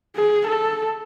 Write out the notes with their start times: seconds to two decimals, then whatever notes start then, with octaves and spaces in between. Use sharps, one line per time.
0.16 G#4
0.47 A4